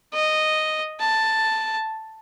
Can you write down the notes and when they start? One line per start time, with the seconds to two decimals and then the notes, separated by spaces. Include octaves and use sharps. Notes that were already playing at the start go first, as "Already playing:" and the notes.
0.14 D#5
1.00 A5